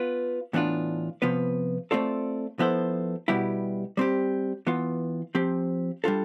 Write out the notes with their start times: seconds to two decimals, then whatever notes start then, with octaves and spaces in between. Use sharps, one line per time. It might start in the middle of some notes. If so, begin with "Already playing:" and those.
Already playing: B3 F4 B4
0.53 A2 E3 B3 D4 F4
1.22 C3 F3 B3 F4 B4
1.91 A3 C4 F4 A4 D5
2.59 F3 B3 E4 A4 C5
3.28 B2 G3 B3 E4 G4
3.97 G3 C4 G4
4.67 E3 B3 F4
5.35 F3 C4 G4
6.04 G3 D4 F4 A4